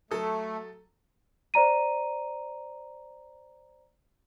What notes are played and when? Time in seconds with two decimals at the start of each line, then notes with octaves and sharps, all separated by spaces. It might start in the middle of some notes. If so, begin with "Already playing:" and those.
0.11 F#3 A3 A4 D#6
1.54 C5 D5 A#5 D#7